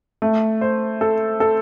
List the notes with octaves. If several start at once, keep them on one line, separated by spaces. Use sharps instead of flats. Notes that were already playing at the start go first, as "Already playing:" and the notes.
A3
C5
A4
A4